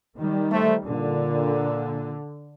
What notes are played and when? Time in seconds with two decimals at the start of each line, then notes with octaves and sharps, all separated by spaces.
0.17 D#3 G3
0.52 A3 C5
0.87 A#2 D3